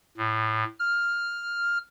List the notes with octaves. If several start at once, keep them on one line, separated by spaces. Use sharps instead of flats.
A2
F6